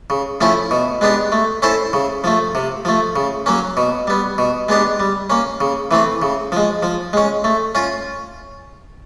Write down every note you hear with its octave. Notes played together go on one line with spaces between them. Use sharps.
C#3
F3 A3 C#4 E4
B2
G#3 B3 D4 G4
A3
C#4 E4 A4 C5
C#3
F3 A3
C3
F3 A3
C#3
F#3 A#3 C#4
B2
G3 B3
B2
G#3 B3 D4 G4
G3
A#3 C#4
C#3
E3 A3 C4
C#3
F3 G#3
F3
G#3 C#4
A3
C#4 F4